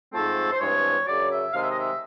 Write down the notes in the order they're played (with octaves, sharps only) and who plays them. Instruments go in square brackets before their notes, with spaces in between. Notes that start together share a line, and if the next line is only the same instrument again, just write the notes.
[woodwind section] G#2 F3 A3 C4 A4
C5
G2 E3 G#3 C4 C#5
F#2 C#3 F#3 D5
E5
C3 D#3 G#3 F5
E5
D#5
E5